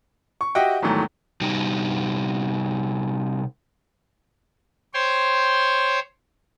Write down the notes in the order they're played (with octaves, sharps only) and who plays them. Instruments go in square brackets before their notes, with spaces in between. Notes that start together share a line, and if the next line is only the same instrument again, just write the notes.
[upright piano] C#6
F#4 G4 D#5 E5 F#5 G5
E2 G#2 D#3 F#3 A3
[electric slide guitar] C3 G3 D#4 G4
[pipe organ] C5 C#5 G5 C6